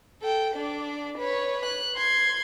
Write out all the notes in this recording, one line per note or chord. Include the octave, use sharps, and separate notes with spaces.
A4 G5
D4 D5
B4 C#5
F#6
C6 G#6